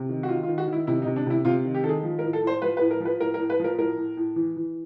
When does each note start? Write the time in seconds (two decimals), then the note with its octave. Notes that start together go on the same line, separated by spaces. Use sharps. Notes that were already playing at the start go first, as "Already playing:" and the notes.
Already playing: C3
0.09 D#3
0.23 F#4
0.28 D#3 F4
0.43 F4
0.49 D#3
0.58 F#4
0.68 D#3 E4
0.87 C3 E4
1.02 D#4
1.06 C3
1.16 D4
1.26 C3 E4
1.45 C3 F4
1.65 D#3
1.74 G4
1.83 D#3 A4
1.89 G#4
2.03 F3
2.19 A#4
2.24 A2
2.33 A4
2.43 A2 C5
2.62 F3 B4
2.77 B4
2.81 A2
2.91 A#4
3.00 F3
3.05 B4
3.20 A2 A#4
3.34 A#4
3.39 A2
3.50 B4
3.60 F3 A#4
3.78 A2 A#4
3.97 A2
4.17 A2
4.36 E3
4.56 E3